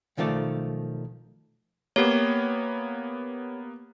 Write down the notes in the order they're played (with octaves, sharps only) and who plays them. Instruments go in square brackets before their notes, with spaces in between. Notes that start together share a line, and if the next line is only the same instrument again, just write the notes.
[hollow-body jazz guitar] B1 D#3 F3 A3 D5
[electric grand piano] A#3 B3 [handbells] G4 C#5